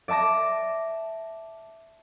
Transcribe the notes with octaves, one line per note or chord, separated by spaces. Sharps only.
D5 E5 A5 D6 A#6